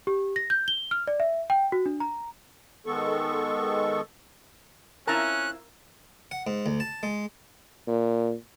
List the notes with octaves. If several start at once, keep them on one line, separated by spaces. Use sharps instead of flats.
G4
A#6
G6
G7
F6
D5
E5
G5
F#4
D4
A#5
D#3 G#3 B3 A4 C#6
C4 C#4 E4 F4 A#4 A5 A#5 F#6
F#5
G#2
D2
A5
G#3
A#2